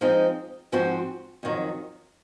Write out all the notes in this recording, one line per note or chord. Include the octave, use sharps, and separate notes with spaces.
F3 G#3 C4 D#4
G#2 F3 C4 F#4
F2 D#3 F#3